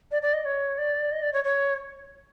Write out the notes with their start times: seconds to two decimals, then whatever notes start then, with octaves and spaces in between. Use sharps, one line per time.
0.11 D5
0.22 D5
0.34 D#5
0.45 C#5
0.78 D5
1.12 D#5
1.22 D5
1.33 C#5
1.44 C#5